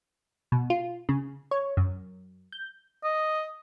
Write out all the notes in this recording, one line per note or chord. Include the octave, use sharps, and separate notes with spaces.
B2
F4
C#3
C#5
F#2
G6
D#5